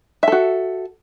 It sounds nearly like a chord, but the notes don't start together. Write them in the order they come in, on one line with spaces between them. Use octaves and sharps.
E5 A4 F#4